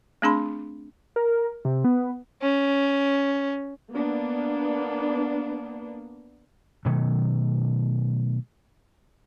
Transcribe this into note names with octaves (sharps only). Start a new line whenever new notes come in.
A3 C4 D4 G#4 B5 C6
A#4
C3
B3
C#4
A#3 B3 D4
B2 D#3 F#3 A3